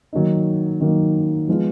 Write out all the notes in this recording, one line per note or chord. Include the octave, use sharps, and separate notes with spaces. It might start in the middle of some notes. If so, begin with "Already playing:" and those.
D#3 F#3 A#3 D#4
D#3 F#3 A#3 D#4
F3 G#3 B3 F4